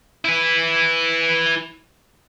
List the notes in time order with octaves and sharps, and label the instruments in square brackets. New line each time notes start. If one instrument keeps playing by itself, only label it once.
[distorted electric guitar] E4 B4